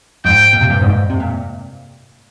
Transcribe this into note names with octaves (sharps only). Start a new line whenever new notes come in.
F2 G#2 G5
A#2
C3
G2 A#2
F2 G#2
C3
A#2